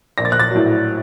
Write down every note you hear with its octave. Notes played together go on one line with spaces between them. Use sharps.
A#1 A#6
A6
F#6
A6
A2 F#3